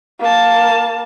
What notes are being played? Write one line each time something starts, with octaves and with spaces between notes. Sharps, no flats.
A#3 A5